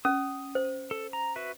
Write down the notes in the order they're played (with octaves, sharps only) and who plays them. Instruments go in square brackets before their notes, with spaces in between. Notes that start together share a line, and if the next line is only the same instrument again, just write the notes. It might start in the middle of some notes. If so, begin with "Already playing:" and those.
[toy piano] C#4 [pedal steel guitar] D#6
[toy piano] C5
[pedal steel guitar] A4
A#5
F#4 B4 E5